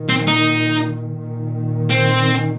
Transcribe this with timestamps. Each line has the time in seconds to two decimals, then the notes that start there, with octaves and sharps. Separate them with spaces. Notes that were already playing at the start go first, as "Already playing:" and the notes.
Already playing: A#2 D#3
0.09 C4
0.27 D#4
1.17 A#2 D#3
1.90 C4